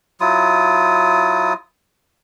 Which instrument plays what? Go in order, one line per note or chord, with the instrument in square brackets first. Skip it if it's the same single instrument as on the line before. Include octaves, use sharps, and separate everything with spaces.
[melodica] F#3 E4 F4 D#6